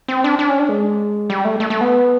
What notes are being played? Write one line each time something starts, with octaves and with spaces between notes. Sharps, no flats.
C4
D4
D4
C#4
D4
G#3
G3
A3
A3
A3
B3